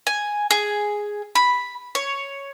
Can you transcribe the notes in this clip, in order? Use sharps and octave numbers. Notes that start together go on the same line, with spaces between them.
G#5
G#4
B5
C#5